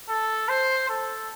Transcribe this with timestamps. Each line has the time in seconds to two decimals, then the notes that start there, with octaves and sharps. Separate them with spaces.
0.09 A4
0.49 C5
0.89 A4